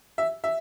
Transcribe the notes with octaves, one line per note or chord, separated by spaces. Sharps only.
E5
E5